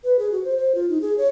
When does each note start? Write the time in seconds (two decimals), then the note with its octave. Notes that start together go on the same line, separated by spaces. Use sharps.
0.04 B4
0.19 G#4
0.32 F#4
0.44 C5
0.58 C5
0.75 F4
0.89 D#4
1.01 G#4
1.18 C#5